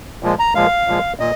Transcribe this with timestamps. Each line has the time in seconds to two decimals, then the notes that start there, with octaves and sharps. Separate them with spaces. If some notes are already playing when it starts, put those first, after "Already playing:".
0.23 A#2 F3 G#3
0.39 A#5
0.55 A#2 F3 G#3 F5
0.88 A#2 F3 G#3
1.20 A#2 D#5